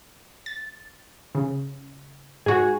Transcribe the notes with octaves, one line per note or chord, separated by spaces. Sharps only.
A6
C#3
G#2 F#4 G#4